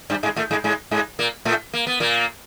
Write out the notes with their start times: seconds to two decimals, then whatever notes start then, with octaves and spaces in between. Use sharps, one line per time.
0.10 G2 G3
0.23 G#2 G#3
0.36 A2 A3
0.51 G#2 G#3
0.64 G#2 G#3
0.91 G#2 G#3
1.19 A#2 A#3
1.45 A2 A3
1.74 A#3
1.87 B3
2.00 A#2 A#3